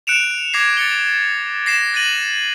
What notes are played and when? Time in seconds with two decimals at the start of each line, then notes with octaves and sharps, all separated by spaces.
0.07 F#6 C#7 D7 E7 F7
0.54 D6 G#6 A#6 C7
0.77 A6 C#7 G7
1.66 A#6 C7 E7
1.93 F#6 A6 A#6 D#7 F#7